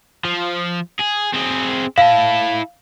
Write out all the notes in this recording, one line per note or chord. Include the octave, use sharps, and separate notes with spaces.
F3
G#4
C4 G#4
E4 F5 A5